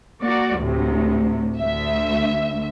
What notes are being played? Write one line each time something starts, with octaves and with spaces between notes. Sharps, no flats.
A#3 F#4 D5
D2 A2 C3
D2 E5